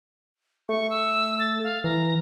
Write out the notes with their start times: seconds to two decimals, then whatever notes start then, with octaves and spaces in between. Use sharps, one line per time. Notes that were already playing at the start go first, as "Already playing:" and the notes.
0.69 A3 C#6
0.90 E6
1.40 A6
1.64 F5
1.84 E3 A#5